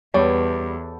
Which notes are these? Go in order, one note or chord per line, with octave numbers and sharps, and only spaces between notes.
E2 G3 B3 G4 A4 C#5